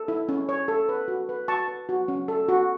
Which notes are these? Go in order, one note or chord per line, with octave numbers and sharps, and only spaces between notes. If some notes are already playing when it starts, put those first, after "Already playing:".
Already playing: A4
E4
C#4
C#5
A4
B4
F#4
B4
F#4 A5 C#6
B4
F#4
C#4
A4
F#4